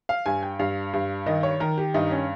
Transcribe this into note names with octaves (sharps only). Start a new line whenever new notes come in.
F5
G2 G#5
G5
G2 F5
G2
D#3 D#5
C#5
D#3 A#4
G4
G2 D#4
C#4